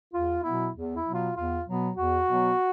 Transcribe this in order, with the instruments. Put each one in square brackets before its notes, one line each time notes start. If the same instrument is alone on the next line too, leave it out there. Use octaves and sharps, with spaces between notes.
[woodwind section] E2 F4
B2 F#3 B3 E4
E2
E4
B2 F#3 B3
F4
E2 F4
B2 F#3 B3
E2 F#4
B2 F#3 B3